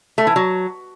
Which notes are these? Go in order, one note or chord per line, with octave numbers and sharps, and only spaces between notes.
A3
E3
F#3